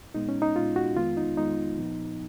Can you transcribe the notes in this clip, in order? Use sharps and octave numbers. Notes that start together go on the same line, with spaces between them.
A#2 G#3 B3 D#4
C#4
D#4
A#2 G#3 B3 F4
F#4
F2 D#3 G#3 B3 F4
D#4
F2 D#3 G#3 B3 D#4
A#2 F3 B3